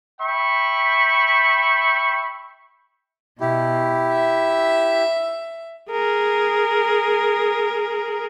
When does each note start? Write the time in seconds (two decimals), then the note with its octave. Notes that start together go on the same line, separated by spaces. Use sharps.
0.20 E5 G5 B5 C#6
3.41 B2 E4 G4
4.12 E5
5.91 G#4 A#4